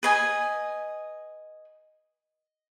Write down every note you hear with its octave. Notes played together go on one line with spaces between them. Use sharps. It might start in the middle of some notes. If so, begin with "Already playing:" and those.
B4 D#5 G#5